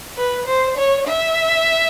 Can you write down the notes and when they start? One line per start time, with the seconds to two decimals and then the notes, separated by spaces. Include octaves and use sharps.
0.18 B4
0.47 C5
0.78 C#5
1.07 E5